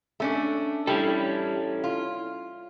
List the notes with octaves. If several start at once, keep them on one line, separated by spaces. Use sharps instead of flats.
A3 C#4 D4
G3 C#4 E4 A4
F4